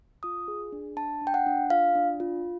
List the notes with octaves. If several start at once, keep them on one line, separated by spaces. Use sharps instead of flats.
F4 D#6
G#4
D4
D4 A5
D4
G5
F#5
D4
F4 F5
D4
F4